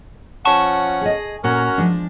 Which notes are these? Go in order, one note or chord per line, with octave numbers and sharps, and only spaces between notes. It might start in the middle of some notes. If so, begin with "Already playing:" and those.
F3 C#4 F#5 A5 C#6
G#4 D#5
A#2 C#4 F#4 A#4
F3 G#3 D4